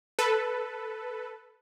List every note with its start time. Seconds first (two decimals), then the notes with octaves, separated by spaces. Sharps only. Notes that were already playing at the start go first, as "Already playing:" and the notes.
0.19 A4 B4